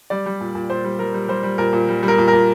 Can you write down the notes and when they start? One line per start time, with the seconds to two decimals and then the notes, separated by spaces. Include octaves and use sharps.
0.10 G3 D5
0.26 G3
0.40 A#2
0.55 A#2
0.70 A#2 C5
0.84 G3
0.99 G3 A#4
1.14 G3
1.28 G3 C5
1.43 G3
1.58 A#2 A#4
1.73 A#2
1.88 G3
2.03 G3
2.08 A#4
2.18 A#2
2.28 A#4
2.33 A#2